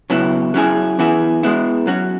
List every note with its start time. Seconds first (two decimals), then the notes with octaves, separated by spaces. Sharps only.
0.10 C#3 F#3 B3 E4
0.54 F#3 C#4 E4 G#4
0.99 E3 B3 E4 G#4
1.43 G#3 B3 E4
1.87 F#3 C#4 F#4